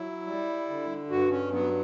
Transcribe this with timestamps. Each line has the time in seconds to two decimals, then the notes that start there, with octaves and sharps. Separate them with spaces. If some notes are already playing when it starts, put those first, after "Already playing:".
Already playing: F#3 E4
0.27 G3
0.69 D3
1.10 G2 F#4
1.31 C#4
1.52 F#3 B3